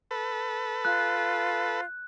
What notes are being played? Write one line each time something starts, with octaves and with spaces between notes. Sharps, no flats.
A4 B4
F4 F#6